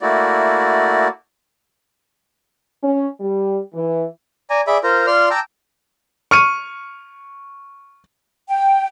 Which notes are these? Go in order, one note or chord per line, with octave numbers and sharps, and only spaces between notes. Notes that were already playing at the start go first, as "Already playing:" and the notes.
A3 A#3 E4 F#4 D5
C#4
G3
E3
D5 G#5 A#5
G#4 D5 E5 B5 D6
F4 A#4 C5 A#5
F4 D5 C6 F6
G5 A5 A#5 D6 E6
C#6 F6 C#7 D#7
G5